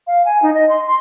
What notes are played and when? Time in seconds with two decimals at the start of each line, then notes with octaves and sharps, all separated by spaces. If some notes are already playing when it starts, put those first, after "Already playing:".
0.07 F5
0.25 G#5
0.42 D#4
0.54 D#5
0.69 C6
0.87 C6